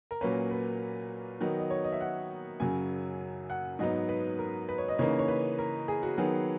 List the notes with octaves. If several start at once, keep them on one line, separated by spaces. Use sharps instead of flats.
A#4
A#2 F#3 A#3 C#4 B4
B4
D#3 F#3 B3 D#4
D#5
C#5
D#5
E5
F#5
F#2 C#3 F#3 G#5
F#5
G#2 F#3 B3 D#4 D#5
B4
A#4
B4
C#5
D#5
C#3 E3 A#3 D#4 C#5
C#5
B4
A#4
G#4
F#4
D#3 F#3 B3 G#4